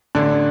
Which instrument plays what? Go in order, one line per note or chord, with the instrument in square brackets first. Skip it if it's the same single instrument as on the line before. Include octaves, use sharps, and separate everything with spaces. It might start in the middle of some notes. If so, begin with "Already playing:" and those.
[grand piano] A1 D3 D4